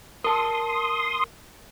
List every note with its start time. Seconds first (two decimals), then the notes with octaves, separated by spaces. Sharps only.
0.24 A#4 A5 C6 D#6